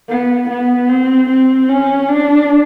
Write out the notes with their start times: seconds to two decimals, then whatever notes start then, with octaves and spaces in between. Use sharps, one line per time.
0.09 B3
0.50 B3
0.89 C4
1.30 C4
1.69 C#4
2.09 D4